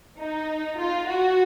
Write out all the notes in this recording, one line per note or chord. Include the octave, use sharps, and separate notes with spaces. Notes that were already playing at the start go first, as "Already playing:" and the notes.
D#4
F4
F#4